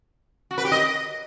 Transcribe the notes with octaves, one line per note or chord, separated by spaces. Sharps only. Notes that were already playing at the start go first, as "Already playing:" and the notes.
F#4
B4
G4
D#5